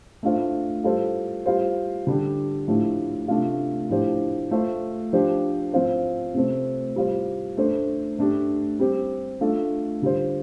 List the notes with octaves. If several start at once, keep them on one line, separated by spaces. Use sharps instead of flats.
A3 D4 F4 C5
G3 F4 A4 C5
G3 F4 C5
D3 G3 D4 G4
A2 F3 A3 D4 G4
C3 A3 D4 F4
A2 F3 D4 G4 C5
A3 F4 C5
F3 D4 G4 C5
F3 C4 F4 C5
C3 A3 C4
G3 F4 C5
A3 D4 A4 C5
A3 D4 G4
G3 C4 G4
A3 D4 F4 A4
D3 G3 F4 C5